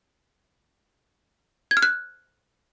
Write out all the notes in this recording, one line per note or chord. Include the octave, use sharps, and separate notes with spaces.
G#6
F6
F#6